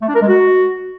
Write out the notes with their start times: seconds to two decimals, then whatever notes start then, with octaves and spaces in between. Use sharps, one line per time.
0.01 A3
0.08 D4
0.15 A#4
0.21 G#3
0.28 F#4